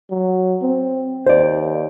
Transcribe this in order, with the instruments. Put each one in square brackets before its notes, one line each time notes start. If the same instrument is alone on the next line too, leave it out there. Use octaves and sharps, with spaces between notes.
[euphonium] F#3
C4
[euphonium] D#2 [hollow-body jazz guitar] C5 D5